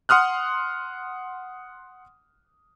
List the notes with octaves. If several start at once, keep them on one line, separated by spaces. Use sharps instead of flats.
F#5 C6 D#6 F6 F#6